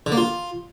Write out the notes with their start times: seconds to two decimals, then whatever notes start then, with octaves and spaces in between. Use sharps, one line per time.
0.06 D3
0.12 A#3
0.17 F4